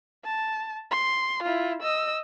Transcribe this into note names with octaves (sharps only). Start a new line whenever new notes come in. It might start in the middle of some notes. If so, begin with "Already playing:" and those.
A5
C6
E4 F4
D#5 E6